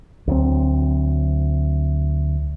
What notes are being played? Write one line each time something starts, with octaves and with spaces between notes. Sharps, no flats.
D2 F#3 C4